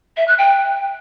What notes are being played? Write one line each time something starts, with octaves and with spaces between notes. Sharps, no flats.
E5
F#6
G5